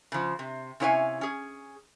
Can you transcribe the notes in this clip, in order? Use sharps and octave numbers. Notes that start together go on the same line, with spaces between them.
C#3 F3
C3
C3 C#4 E4 C#5 F5 G#5
C#4 G#4